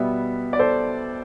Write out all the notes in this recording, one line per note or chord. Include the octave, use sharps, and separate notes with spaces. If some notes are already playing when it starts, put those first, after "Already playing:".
Already playing: B2 G3 B3 E5
D5
A4 C5